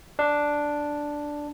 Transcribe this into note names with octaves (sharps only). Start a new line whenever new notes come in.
D4